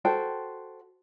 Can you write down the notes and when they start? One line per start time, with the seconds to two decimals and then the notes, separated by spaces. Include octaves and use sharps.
0.05 F#4 A4 C5 G5